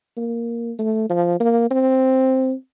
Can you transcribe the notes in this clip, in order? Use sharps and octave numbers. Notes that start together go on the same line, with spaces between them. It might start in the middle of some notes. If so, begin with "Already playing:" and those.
A#3
A3
F3
A#3
C4